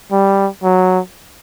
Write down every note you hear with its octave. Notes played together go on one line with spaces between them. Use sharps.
G3
F#3